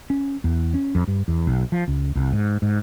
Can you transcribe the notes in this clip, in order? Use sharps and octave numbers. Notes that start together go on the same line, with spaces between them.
C#4
E2
C#4
F2
G2
E2
B1
F3
C#2
C2
G#2
G#2